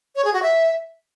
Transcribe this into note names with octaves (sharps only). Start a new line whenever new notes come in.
C#5
G#4
F#4
E5